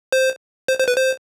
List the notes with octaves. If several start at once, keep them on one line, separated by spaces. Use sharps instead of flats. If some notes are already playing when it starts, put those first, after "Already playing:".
C5
C5
C5
B4
C5